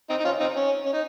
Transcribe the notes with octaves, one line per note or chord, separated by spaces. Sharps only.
C4 D#4
D#4
C#4 F4
C4 D#4
C#4
C#4
D#4